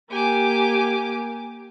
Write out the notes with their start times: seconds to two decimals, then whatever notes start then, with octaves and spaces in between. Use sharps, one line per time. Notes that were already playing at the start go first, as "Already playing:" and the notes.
0.11 A#3 G4 G#5 D6